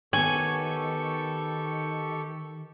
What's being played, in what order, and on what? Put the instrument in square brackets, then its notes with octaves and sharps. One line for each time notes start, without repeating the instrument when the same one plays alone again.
[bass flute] D#3 [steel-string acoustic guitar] B3 C#5 [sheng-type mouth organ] G4 A4 C#6 [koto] G#5